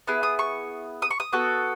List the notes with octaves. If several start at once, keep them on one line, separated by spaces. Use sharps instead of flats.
B3 E4 G#4
D#6
C#6
D#6
C#6
D#6
B3 F#4 A4